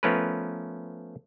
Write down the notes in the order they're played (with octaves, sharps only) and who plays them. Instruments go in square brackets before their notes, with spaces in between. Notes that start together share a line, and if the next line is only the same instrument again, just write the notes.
[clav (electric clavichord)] F3 A3 B3 C#4 A#4 B4